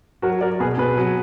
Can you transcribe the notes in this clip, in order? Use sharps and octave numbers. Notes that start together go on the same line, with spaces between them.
F#3 F#4 A#4
F#3 A#4 D5
B2 G#4 B4
B2 G#4 B4
F#3